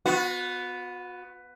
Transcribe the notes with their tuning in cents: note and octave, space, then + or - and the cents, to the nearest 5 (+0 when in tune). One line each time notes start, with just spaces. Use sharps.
B3 +10 F#4 -40